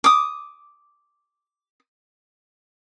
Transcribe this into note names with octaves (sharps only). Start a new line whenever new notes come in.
D6 D#6